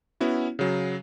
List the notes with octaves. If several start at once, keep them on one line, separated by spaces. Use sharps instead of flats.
B3 C#4 E4 F#4
C#3 F#3